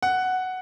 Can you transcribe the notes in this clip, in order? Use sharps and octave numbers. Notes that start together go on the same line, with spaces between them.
F#5